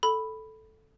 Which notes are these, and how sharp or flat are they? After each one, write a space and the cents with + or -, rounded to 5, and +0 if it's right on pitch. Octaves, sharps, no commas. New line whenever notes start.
A4 +0 B5 +0